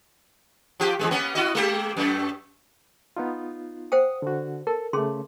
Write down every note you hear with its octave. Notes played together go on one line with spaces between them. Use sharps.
F3 G4
E2 C#3 G#3
A#3 B3 C#4
E4 F#4 D#5
G#3 A#3 G4
F#2 A3
B3 D#4 F4
C5 F#5 G5 D#6
D3 F#4
A4 A#4
C#3 A3 C#4 G#4 C6